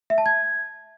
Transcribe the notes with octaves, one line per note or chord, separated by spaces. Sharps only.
E5
A5
G#6